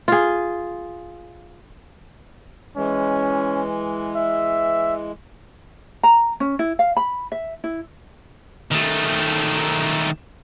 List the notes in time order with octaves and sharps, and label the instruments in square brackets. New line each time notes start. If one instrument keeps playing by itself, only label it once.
[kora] F4 G#4
[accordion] E3 G#3 [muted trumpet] C#4
[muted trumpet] E5
[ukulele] A#5
C#4
E4
F5
B5
E5
E4
[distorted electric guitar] D#3 A3